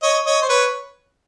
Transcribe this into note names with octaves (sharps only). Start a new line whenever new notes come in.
C#5 D#5
C#5 D#5
C5
B4 C#5